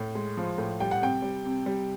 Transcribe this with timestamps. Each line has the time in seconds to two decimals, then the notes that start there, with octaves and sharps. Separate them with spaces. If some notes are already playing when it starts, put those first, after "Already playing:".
Already playing: A2
0.15 G#3
0.37 F3
0.58 A2
0.80 G3 G5
0.91 F#5
1.02 C3 G5
1.22 G3
1.45 C3
1.66 G3